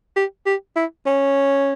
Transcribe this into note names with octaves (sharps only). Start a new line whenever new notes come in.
G4
G4
E4
C#4